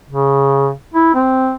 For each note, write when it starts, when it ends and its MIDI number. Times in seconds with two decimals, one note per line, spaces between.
0.10 0.71 49
0.94 1.13 64
1.15 1.54 60